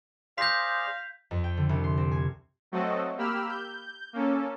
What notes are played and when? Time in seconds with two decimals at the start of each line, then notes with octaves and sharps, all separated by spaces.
0.38 G#4 C5 D5 F5 C6 G6 A#6 B6
1.31 F2
1.44 G5
1.57 D3
1.69 C2
1.84 C6
1.97 C4
2.11 G#5
2.72 F#3 A3 C4 F#4 A4 D#5
3.17 A#3 G4 B5 E6 F6
3.48 G6
4.13 A#3 C#4 A4